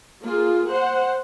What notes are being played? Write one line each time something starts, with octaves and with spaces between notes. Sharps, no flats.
A#3 F4 G#4
C5 F#5